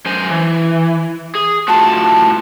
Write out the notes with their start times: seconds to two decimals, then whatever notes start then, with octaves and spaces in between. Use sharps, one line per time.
0.06 F#2 C5 G#5
0.30 E3
1.35 G#4
1.68 A2 F4 F#4 A5